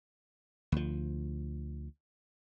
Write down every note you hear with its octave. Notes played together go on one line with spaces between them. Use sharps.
D2 F3